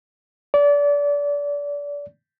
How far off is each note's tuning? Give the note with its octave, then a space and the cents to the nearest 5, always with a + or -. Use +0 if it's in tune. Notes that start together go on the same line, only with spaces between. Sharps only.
D5 -30